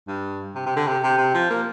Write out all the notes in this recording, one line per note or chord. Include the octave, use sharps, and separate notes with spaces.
G2
C3
C3
D3
C3
C3
C3
F3
A#3